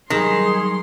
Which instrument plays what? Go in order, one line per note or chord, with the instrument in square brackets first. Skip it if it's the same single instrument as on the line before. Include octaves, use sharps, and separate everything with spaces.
[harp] G2 F#3 [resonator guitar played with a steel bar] D#3 [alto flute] G#4 [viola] C6